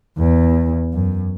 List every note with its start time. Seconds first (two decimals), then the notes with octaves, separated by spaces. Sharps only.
0.18 E2
0.93 F#2